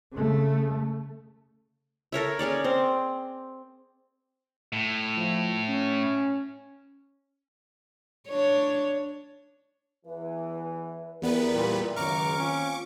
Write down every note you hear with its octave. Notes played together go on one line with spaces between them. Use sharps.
C#3 A3
A4 A#4 C#5 E5
C#4 G#4 C#5 D5
C4
A2
F3
C#4
D4 C#5
E2 E3 B4
E2 B3 E4 G4 A#4 B4 D5
A#2 G3
C#2 F#2 D#3 A#5 C#6 D6 F6
A#3 C4 C#4 F4